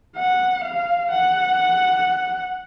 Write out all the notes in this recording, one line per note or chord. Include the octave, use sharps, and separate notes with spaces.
F#5
F5
F#5